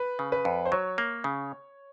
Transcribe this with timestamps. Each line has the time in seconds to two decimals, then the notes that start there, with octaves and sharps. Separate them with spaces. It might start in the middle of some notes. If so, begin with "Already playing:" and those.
Already playing: B4
0.19 C#3
0.32 B4
0.45 F2
0.65 C5
0.72 F#3 C#5
0.98 A#3
1.24 C#3